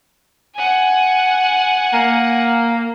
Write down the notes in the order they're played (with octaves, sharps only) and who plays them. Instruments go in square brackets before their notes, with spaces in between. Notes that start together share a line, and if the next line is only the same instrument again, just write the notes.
[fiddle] F#5 G#5
[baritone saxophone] A#3